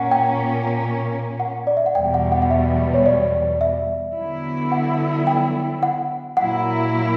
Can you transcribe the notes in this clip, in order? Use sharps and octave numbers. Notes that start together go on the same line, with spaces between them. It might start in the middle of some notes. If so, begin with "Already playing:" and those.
Already playing: A#2 A#3 C#4 F#5
G5
F#5
D5
E5
F#5
E2 B2 G3 G5
F#5
F#5
F#5
E5
C#5
D5
E5
D3 F#3 B3 E4
F#5
G5
F#5
A#2 F#3 A#3 E4 F#5